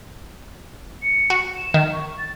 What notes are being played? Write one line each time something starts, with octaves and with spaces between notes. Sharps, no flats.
C#7
F#4
E7
D#3
C#6
A6